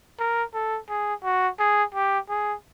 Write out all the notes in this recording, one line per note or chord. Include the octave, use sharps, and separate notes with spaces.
A#4
A4
G#4
F#4
G#4
G4
G#4